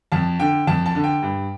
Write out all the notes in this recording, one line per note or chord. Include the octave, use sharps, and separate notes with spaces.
F2 A5
D3 G5
F2 A5
A5
D3
G5
G2